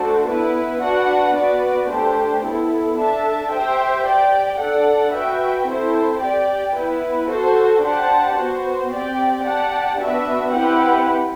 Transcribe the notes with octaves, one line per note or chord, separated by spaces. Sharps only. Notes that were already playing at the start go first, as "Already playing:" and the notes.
Already playing: A3 D4 F#4 A4 C5
B3 E4 B4
D4 F#4 B4 F#5
B3 F#4 B4 D5
A3 D4 G4 C5
B3 E4 A4
D4 A4 E5 A5
G4 C5 E5 G5
G4 D5 G5
D4 A4 D5 F#5
F#4 B4 E5 G5
C4 E4 A4 C5
G4 D5 G5
B3 E4 B4
F#4 A4 C5
D4 G4 C5 F#5 A5
B3 F#4 C5
C4 G4 D5 G5
G4 D5 F#5 A5
B3 D4 F#4 B4 E5
C4 E4 G4 B4 F#5